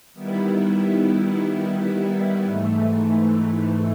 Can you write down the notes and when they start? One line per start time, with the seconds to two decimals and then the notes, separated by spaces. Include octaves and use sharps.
0.13 D#3 G3 B3 E4
2.44 G#2 E3 A3